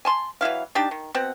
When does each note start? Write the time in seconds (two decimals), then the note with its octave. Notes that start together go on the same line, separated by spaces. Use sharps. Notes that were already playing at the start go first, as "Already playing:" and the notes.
0.05 G#5 A5 C6
0.41 E3 F#3 E4 F5
0.75 D4 D#4 G4 A5
0.91 D#3
1.15 B2 C4 F#5